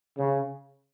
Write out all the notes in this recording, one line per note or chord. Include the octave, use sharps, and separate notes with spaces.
C#3